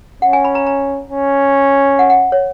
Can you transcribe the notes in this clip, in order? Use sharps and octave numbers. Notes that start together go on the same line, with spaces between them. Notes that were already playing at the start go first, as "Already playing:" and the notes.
C#4 F#5
G#5
B5
A#5
A#5
C#4
F#5
F#5
C#5